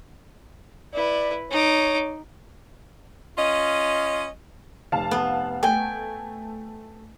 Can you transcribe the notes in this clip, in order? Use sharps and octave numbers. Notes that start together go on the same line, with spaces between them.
E4 B4 D5
D#4 C#5 D6
C#4 F4 D#5
F1 F5 A5
B3
A3 G5 G#5